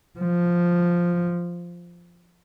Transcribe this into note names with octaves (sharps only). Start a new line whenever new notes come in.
F3